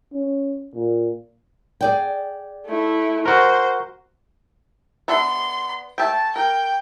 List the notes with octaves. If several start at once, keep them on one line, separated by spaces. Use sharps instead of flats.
C#4
A#2
G#4 D5 G5
A3 E4
F#4 A#4 C5
B3 D4 E5 C6
A3 E5 G5 A5
A#4 G5